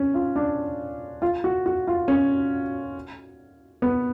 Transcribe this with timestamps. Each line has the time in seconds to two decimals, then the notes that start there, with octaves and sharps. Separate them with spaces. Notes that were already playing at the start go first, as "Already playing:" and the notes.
Already playing: C#4
0.14 F4
0.36 D4
1.22 F4
1.44 F#4
1.66 F#4
1.87 F4
2.08 C#4
3.82 B3